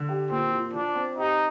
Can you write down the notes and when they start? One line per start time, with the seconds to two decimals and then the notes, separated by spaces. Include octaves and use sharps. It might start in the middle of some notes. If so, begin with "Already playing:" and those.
Already playing: D3
0.09 G4
0.30 A#2 C4
0.52 F3
0.74 F3 D4
0.95 C4
1.17 D#4 G4